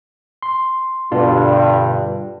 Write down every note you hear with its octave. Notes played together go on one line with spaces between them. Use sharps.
C6
G2 B2 D3 D4 F4